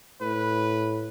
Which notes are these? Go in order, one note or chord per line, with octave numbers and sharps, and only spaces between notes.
A2 B4